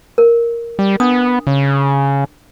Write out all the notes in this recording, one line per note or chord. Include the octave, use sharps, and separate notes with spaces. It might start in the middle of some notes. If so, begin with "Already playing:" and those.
A#4
G3
B3 D4 D#6
C#3